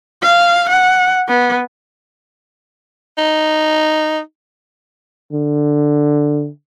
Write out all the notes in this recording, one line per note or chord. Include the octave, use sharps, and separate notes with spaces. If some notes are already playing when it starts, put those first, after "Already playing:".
F5
F#5
B3
D#4
D3